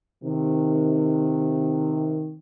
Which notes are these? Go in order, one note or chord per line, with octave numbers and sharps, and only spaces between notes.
C3 D#3